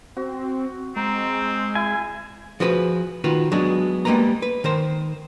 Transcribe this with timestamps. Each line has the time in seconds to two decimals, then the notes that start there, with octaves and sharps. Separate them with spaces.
0.17 C4 F#4
0.96 G#3 C4 A#5
1.75 E4 G#5
2.60 F3 F#4 G#4 B4
3.24 D#3 F4 F#4 B4
3.52 F#3 G#3 B3 D4
4.05 G3 G#3 A#3 B4 A#5
4.42 B4
4.64 D#3 A#4 C5